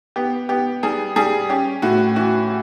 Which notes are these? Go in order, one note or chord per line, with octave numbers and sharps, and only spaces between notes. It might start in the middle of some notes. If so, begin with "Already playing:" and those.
B3 G4
B3 G4
G3 G#4
G3 G#4
C#4 G4
A2 F#4
E3 F#4